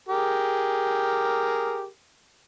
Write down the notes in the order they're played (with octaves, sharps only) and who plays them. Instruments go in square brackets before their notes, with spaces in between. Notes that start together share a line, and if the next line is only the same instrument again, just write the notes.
[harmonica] G4 G#4 A#4